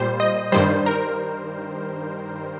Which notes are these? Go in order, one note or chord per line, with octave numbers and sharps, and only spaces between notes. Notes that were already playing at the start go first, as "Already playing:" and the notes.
Already playing: A#2 G3 C5
D#5
G2 D#3 G3 C5
A#4